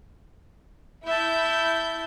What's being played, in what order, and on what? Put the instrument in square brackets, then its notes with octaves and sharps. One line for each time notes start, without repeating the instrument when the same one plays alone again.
[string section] E4 G6 [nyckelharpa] E5 A5